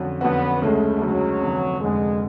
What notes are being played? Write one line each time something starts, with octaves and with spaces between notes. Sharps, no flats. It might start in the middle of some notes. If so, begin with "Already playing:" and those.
Already playing: F2 D3 F#3 C#4 F#4
F2 D3 F#3 B3 C#4 F#4
D2 C#3 G#3 A3
D2 C#3 F#3 G#3
F1 F2 D3
F1 F2 D3 G#3